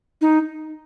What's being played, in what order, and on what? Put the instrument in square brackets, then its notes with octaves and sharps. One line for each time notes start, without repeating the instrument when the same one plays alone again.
[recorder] D#4